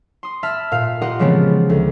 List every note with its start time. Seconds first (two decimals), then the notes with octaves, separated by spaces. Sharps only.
0.23 C6 D#6
0.43 E5 A5 B5 E6 F6
0.72 A#2 F5
1.01 F4 G4 A#4 D#5 F#5 C6
1.19 C#3 E3 F3 G#3 B3 C4
1.69 D2